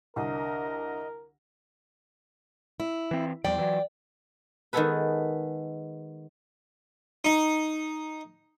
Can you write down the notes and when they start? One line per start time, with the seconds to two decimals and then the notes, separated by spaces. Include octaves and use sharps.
0.16 C2 D3 A#4 D#5
2.80 E4
3.11 E3 C4
3.44 E2 F3 G3 D5 G5
3.58 E3 F#3
4.73 D#3 G#3 B3 G#4 A4 B4
7.25 D#4